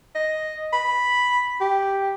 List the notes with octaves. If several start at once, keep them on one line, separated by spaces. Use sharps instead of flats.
D#5
B5
G4